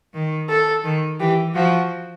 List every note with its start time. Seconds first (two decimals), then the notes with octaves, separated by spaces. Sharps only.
0.14 D#3
0.49 A4
0.84 D#3
1.20 E3 G4
1.55 F3 F#4